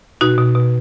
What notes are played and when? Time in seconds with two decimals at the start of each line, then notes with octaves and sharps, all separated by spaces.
0.21 B2 D#4 F#4
0.38 B2
0.55 B2